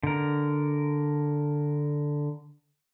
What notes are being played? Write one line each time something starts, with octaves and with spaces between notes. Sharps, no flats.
D3 A#4